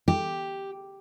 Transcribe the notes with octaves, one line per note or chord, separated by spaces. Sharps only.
G4